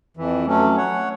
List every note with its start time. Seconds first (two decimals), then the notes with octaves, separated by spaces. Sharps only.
0.17 F2 E3
0.46 F#3 A3 C#4
0.77 C#5 F#5